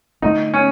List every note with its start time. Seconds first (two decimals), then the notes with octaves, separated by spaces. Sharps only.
0.22 D3 F#3 A3 C4 D#4
0.54 C#4